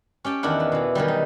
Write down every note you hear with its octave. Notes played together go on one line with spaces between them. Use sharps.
C#4 G4 G5 A5
E2 D#3 D4 E4 F#5
B3
B2 E3
D#3 E3 F#3 G3
D#4